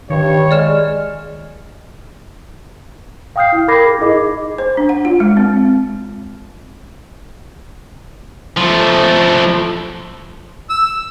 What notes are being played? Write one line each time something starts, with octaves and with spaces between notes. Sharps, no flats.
G2 D#3 C#5
G#3 D5 F6 E7
F5 G5 D#6 F6 G6 C7
E4
A#4 B5 D6 G#6 A#6 C7
G#4
D#4 E4 G#4 D#5 D6
C5
D4
F#5
F4
G#3
C4
F3 A3
E6